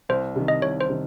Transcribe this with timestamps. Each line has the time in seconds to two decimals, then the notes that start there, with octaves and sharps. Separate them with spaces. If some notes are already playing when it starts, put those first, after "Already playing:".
0.09 C2 C5
0.36 C3 D#3
0.48 D#5
0.62 C2 C#5
0.81 C5
0.89 C3 D#3